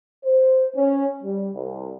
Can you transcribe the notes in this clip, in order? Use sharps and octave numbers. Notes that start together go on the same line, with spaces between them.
C5
C#4
G3
C2